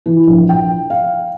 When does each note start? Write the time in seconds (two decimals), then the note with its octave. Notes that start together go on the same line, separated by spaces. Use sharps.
0.06 E3
0.27 A#1
0.49 G5
0.90 F5